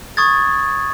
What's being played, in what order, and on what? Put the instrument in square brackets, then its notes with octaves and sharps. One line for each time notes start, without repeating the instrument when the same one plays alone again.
[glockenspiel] C#6 D#6 G#6 A6